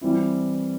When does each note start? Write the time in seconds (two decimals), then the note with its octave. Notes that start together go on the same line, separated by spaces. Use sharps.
0.01 E3 G3 C4 E4